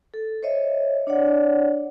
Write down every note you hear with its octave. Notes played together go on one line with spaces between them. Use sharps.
A4
C5 C#5 D#5 E5
D4 C#5 D5 F#5